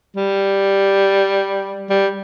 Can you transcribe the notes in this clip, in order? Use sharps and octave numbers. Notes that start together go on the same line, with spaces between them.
G3
G3